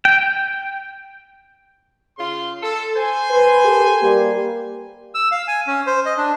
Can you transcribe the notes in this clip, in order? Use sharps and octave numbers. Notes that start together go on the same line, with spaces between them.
G5
C#3 F4 C6
A4
C5 G#5
B4
G4 A4 A#4
G3 A#3 G4
E6
F5
G#5
C#4
C5
D#5
D4